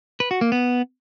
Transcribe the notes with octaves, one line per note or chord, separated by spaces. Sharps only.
B4
F#4
A#3
B3